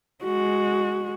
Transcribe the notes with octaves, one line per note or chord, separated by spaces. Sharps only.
G#3 F#4